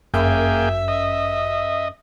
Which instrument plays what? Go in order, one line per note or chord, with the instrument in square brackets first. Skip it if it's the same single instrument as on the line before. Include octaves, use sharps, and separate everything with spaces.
[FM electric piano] G1 [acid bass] F#2 [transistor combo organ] A#3 G#4 G5 [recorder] E5
[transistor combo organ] D#5